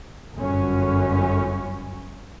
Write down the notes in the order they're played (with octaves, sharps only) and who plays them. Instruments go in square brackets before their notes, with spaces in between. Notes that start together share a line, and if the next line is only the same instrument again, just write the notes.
[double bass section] G1 F#2 F#3 C#4